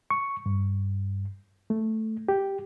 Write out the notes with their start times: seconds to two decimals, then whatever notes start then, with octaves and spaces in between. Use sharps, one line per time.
0.10 C#6
0.46 G2
1.70 A3
2.29 G4